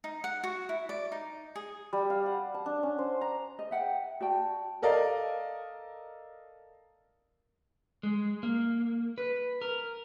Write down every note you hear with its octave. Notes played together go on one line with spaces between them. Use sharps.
D#4
F#5
F#4
E4
D5
D#4
G#4
G3
F5
F#5
A5
D4
C#4
C5
A#5
D#5
E5 F#5 G5
F#4 D5 G5 A5
A4 A#4 D5 D#5 F5
G#3
A#3
B4
A#4